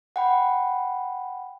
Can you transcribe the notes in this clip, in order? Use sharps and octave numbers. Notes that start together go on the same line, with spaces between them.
F#5 G5 B5